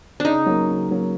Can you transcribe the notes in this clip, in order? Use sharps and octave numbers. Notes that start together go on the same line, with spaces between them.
C#3 D4 D#4
F#3 A#3
C#3
F#3 A#3